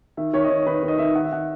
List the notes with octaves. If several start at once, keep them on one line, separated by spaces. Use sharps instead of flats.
D#3 E5
D#3 C#5
D#5
D#3 C#5
D#3 B4
D#3
D#5
D#3 E5
D#3 F#5
E5
D#3 F#5